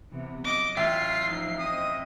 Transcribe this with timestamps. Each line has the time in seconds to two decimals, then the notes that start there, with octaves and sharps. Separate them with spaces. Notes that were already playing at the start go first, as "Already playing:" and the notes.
0.12 C3 E3 B3
0.44 F#3 D#5 D6
0.77 A1 F4 E5 G5 C7
1.25 F3 D#4
1.59 C4 D#5 D#6